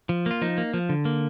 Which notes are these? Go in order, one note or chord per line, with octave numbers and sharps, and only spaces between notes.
F3
A#3 F4
F3 D#4
A#3
F3
D3
A#3